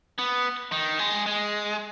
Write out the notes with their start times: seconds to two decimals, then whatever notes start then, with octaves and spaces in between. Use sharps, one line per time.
0.18 B3
0.72 D#3
0.99 G#3
1.26 G#3